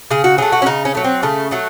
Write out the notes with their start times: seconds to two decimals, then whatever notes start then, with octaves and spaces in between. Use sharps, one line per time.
0.10 C#3 G#4
0.24 F#4
0.38 F#3 A3 G#4
0.52 F#4
0.62 C#4
0.66 C#3 D#4
0.85 C#4
0.95 F#3 A3
1.04 C4
1.23 C#3 A3
1.51 F#3 A3